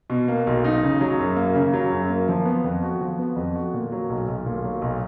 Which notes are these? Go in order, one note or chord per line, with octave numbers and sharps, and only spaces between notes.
B2
A#3
B1
D#4
C#3
F#3
F#2
A#3
C#3
F#3
F#2
A#3
F3
B3
F2
F#4
F3
B3
F2
F#4
A#2
F#3
B1
B1
A#2
F#3
B1